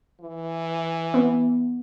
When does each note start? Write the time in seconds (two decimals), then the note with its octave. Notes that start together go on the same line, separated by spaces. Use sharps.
0.20 E3
1.14 B3